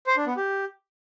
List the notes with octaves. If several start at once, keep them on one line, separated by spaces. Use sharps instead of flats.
C5
D4
B3
G4